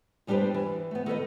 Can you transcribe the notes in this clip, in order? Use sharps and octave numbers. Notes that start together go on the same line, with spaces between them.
E2 G3 D4 G4 B4 C5
E3
A3 B3
D#3 A4 B4 D#5